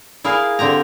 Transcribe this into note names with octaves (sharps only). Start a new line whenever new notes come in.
E4 G#4 A#4 F5
D3 C4 G4 A#5